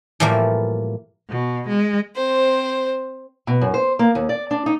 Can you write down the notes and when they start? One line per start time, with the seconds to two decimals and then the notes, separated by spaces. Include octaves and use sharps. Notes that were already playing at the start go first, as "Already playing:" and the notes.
0.20 A2 E3 F3 G3 A#3
1.30 B2
1.68 G#3
2.15 C4 C5
3.47 B2
3.61 F#2
3.74 C5
3.99 A#3
4.15 D#2
4.29 D5
4.51 D4
4.66 D#4